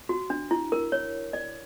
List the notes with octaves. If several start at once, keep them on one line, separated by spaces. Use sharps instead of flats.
F#4
D4
E4
A#4
C#5
D5